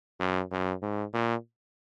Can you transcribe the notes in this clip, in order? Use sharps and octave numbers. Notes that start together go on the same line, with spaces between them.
F#2
F#2
G#2
A#2